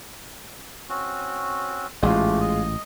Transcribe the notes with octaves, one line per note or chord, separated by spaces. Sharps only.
C4 C#4 F#4
A1 G#2 G#3 A3 F4 G4
D#5